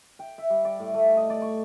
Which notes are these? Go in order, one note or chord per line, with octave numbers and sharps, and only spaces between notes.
G5
E5
G3
D5
A2
A3
D#5
D5
C#6